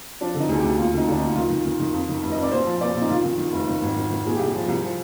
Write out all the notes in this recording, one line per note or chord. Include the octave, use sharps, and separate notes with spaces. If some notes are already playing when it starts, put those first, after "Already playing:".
F3 D4
D3
D#4
D2 G#4
D2 G4
D#2 F4
D3 D#4
D3 D4
D#2 D#4
D#3 F4
D#3
D#3
D#3
F2
D#3
F1
D#5
F2
D5
A#1 C5
F3
A#2 D5
A#1
D#4
D#3 F4
D#3
D#3
F1
D#3
G#1
D#3
D#3
A#2 G#4
C2 G4
G#4
F3
C2
F3